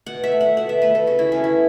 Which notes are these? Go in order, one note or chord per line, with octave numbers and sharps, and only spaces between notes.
B2 F#5
E5
A3
F#5
B2 F#5
E5
A3 B4
A4
C#3 F#4
E4
F#3 B3 C#4
E4